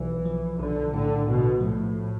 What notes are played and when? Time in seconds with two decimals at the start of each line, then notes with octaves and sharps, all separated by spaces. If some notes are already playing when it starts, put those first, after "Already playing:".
Already playing: B1 E3
0.25 F3
0.59 B1 D3
0.93 A2 D3
1.27 B1 B2
1.61 A2 F3